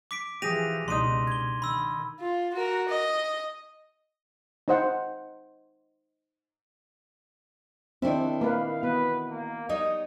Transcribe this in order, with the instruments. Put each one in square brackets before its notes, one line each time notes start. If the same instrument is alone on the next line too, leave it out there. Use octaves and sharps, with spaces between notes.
[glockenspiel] D6 B6 D7
[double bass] E3 F3 [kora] G4 G#4 [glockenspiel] A#6 D#7 F7
[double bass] C#2 B2 [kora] D4 D#4 [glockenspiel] C6 D#7
[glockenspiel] G#6 G7
[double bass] D#3 [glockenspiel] B5 E6
[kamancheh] F4
F#4 A#4
D#5
[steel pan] D#4 C5 F#5
[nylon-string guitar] D#3 E4 [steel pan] C4 D4
[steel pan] A#3 B4 [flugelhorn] F5
[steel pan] B3 [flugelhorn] B4
[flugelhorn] A#3
[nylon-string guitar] G3 D#4 C#5 [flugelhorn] D#5